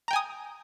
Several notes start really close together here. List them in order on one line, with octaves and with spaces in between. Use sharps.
A#5 G5 G#5 D#6